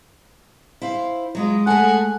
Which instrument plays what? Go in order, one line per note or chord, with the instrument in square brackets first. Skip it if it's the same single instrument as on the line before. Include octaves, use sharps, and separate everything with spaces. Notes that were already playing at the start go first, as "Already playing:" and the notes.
[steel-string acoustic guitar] E4 C5 F5
[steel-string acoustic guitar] F#3 E4 F4 [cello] G#3
[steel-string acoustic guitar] A3 A4 [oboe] F#5 [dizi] G#5